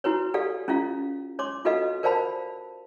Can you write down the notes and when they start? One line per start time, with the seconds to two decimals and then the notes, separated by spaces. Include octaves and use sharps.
0.04 E4 F#4 B4 C#5
0.34 G4 A4 D5 F5
0.68 C#4 E4 F4 F5
1.39 C#5 C6 D6
1.65 F4 F#4 A4 B4 D#5 F5
2.03 A#4 C5 D5 F5 A5 B5